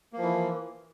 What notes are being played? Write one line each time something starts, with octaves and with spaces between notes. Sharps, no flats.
E3 F3 A#3